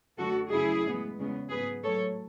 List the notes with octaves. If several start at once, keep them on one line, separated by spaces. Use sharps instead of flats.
F#2 D3 A3 F#4 A4
F#2 C#3 F#3 A3 E4 G#4
A2 E3 G#3 B3
E2 C#3 G#3 B3
G#2 F#3 B3 G#4 B4
A2 F#3 A3 A4 C#5